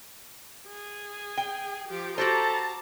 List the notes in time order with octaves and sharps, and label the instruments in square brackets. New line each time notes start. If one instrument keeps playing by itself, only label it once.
[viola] G#4
[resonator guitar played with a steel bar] G5
[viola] F3 G4
[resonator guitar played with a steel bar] F#4 G4 C5 [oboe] A4 [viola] A5 A#5